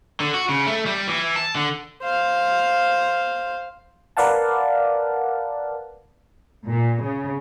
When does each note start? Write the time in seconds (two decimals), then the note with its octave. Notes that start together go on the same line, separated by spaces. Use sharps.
0.20 D3
0.34 F#4
0.49 C#3
0.66 A3
0.86 G3
1.07 E3
1.36 A5
1.55 D3
2.02 C5 F5
4.17 A#4 B4 D5 F5 F#5 A5
6.68 A#2
7.03 C#3